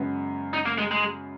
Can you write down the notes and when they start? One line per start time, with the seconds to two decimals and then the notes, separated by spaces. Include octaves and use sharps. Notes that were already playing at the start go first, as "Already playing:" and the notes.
Already playing: F#2 C#3 G#3 B3
0.53 D#4
0.66 A#3
0.78 G#3
0.91 G#3